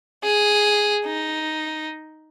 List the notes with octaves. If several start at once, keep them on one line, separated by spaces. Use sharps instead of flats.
G#4
D#4